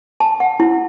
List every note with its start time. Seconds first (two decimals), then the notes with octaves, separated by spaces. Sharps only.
0.20 A5
0.40 F#5
0.60 E4